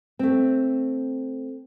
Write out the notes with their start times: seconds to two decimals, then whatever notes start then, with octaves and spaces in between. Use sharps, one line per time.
0.19 A3 C4